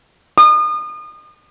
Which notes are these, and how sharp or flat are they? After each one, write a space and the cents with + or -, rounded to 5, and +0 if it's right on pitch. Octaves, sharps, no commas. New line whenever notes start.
D#6 -35